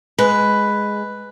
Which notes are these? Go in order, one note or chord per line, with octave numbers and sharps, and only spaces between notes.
G#3 B4